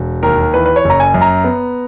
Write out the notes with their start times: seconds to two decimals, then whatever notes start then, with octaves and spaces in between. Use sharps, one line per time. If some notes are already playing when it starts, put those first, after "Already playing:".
Already playing: E1
0.23 D#2 A#4
0.54 E3 B4
0.66 B4
0.76 C#5
0.85 F#1
0.90 A#5
1.00 G#5
1.14 F#2
1.21 A#5
1.44 B3